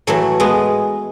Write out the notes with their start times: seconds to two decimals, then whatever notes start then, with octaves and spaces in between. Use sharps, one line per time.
0.07 A2 E3 F#3 A3
0.40 G#3 B3